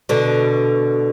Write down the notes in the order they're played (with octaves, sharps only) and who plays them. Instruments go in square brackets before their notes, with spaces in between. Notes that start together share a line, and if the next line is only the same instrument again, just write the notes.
[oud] B2 D3